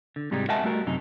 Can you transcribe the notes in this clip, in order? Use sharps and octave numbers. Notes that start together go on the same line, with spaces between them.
D3
G#2 C3 G3 G#3 D#4
A#4 D#5 E5 F#5 G#5 A5
G3 A3 F#4 A#4
F#2 C3 D#4